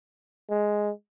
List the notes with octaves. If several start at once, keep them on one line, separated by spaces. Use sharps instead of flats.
G#3